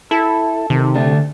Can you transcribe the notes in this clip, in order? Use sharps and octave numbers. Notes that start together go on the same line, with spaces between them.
E4 A4
C3 D#3
D3 A3 D4